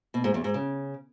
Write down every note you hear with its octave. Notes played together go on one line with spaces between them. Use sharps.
B2
G#2
E2
G#2
C#3